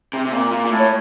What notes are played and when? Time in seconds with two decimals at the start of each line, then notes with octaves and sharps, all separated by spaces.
0.13 C3
0.25 C3
0.32 A#2
0.51 A#2
0.65 A#2
0.70 A2
0.79 C#5